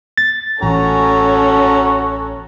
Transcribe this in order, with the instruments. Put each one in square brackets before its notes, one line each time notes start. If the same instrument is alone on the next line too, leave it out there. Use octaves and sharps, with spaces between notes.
[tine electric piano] A6
[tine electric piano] A1 [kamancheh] C#4 A4 [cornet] F#4 [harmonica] G#5 A#5